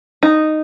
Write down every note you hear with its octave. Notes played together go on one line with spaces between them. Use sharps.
D#4